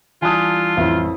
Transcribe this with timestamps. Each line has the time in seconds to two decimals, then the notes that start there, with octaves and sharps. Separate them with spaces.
0.22 E3 G3 D4 F4 G#5 A5 D#6
0.77 A1 F2 E4 B4 E5